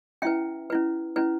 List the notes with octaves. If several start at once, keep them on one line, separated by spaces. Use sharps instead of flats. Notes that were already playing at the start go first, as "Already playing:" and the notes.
C#4 E4 B4 E5 G5
C#4 E4 B4
C#4 E4 B4